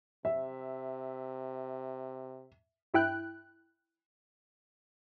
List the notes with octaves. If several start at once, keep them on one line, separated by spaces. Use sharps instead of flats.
C3 E5
G2 E4 G5 F#6